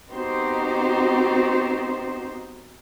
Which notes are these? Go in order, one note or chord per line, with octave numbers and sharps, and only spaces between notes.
B3 C4 D#4 F#4 G4 C5